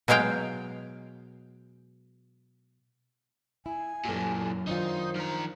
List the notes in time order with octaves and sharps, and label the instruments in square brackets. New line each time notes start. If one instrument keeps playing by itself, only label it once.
[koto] B2 F#3 G#3 F5 G5
[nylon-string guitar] E4 [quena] G#5
[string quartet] F#2 [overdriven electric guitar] A#2 E3 [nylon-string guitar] G4 A4
[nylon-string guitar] D#3 D4 F4 [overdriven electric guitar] D#4 [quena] C5
[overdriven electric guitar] F3 A#5